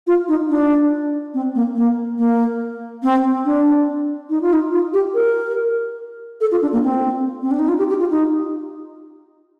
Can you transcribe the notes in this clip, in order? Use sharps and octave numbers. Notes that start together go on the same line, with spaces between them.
F4
D#4
D4
C4
A#3
A#3
A#3
C4
D4
D#4
F4
D#4
F4
G4
A#4
A4
F4
D4
A#3
C4
C4
D4
D#4
F4
G4
G4
F4
D#4